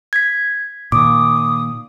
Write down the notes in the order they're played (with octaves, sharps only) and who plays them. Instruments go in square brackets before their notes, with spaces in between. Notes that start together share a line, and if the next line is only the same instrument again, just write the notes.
[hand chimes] G#6 B6
[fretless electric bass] A#2 D#3 [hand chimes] D6 [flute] D#6